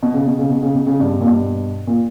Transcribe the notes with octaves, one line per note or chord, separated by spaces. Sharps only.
B2
C#3
B2
C#3
B2
C#3
B2
C#3
G2 B2
A#2
G2 B2
A#2